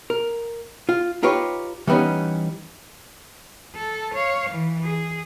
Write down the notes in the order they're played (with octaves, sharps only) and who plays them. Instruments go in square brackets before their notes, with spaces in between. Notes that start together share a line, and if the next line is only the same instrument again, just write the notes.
[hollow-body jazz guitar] A#4
F4
D#4 F4 G4 B4 C#5
E3 G3 B3 C#4 D#4
[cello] A4
C#5 F5
E3
G#4